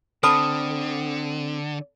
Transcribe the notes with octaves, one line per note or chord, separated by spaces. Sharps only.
D3 C4 A4 A5 B5 D#6 F6